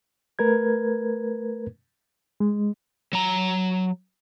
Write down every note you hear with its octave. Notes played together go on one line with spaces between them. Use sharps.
A3 A#4 B4 G#6
G#3
F#3 A#5